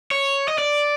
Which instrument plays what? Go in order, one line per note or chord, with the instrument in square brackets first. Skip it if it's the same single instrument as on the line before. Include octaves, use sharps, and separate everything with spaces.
[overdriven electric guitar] C#5
D#5
D5